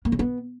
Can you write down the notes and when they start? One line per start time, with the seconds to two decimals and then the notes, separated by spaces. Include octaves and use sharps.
0.05 A#3
0.12 C#3
0.19 B3